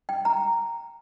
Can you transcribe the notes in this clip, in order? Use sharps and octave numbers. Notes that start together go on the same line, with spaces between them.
G5
A#5